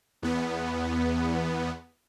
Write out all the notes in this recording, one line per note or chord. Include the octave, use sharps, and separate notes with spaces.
E2 B3